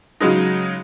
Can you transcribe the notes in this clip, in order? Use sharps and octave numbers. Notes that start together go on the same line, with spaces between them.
C#3 F#3 G#3 D#4